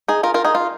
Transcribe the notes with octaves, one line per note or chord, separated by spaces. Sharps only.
D#4 G#4
F4 A#4
F4 A#4
D#4 G#4
F4